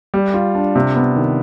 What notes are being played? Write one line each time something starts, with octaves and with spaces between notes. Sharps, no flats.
G3
F4
D4
C3
B3
D#3